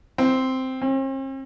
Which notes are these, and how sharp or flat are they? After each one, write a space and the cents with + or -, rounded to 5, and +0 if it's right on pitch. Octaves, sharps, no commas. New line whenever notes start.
C4 -5
C4 +45